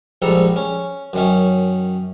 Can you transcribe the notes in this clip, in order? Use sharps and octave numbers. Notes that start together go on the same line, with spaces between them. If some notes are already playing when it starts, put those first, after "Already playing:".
A#1 G#2 G3 A4 A#5
C#4
F#2 D#3 C#4